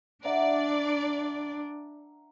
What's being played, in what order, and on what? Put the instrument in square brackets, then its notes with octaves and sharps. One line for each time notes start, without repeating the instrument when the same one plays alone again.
[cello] D4 [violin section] D5 [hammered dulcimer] E5 F#5 A#5